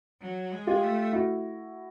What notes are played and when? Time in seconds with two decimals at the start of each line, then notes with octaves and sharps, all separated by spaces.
0.21 F#3
0.52 G#3
0.67 F4 G4
0.83 A3
1.13 E4 F#4